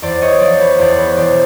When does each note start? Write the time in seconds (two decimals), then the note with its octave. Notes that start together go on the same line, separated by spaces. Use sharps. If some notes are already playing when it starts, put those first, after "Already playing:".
0.02 E2 C5 D5
0.21 C#5 D#5
0.40 F3 C5 D5
0.60 B4 C#5
0.79 E2 C5 D5
0.98 B4 C#5
1.17 E1 C5 D5